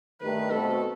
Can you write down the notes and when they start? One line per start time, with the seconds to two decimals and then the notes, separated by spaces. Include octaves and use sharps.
0.21 G2 D#3 A3 D#4 G4 B4
0.50 B2 A3 C4 F#4 A4